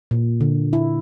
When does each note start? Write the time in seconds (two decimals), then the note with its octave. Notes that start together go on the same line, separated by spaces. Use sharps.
0.11 A#2
0.41 D3
0.73 E4